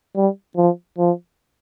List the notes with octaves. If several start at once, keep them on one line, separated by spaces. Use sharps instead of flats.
G3
F3
F3